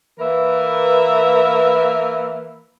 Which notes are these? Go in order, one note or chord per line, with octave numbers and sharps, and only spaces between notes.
E3 A#3 A#4 B4 E5